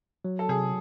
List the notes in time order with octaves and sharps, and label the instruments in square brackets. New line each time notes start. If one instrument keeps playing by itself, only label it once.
[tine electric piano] F#3
[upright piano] A4
[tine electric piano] C3 [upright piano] G#4